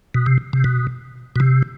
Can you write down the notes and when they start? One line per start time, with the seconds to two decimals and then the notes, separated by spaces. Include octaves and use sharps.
0.15 B2
0.26 C3
0.53 C3
0.64 B2
1.36 B2
1.40 C3